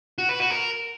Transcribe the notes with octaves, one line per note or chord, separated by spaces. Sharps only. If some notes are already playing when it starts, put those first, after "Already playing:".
F#4
B4
F#4
A#4